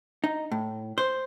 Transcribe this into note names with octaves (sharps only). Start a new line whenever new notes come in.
D#4
A2
C5